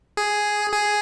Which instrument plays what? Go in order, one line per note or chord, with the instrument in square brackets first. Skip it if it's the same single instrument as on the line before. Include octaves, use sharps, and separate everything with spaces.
[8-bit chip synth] G#4
G#4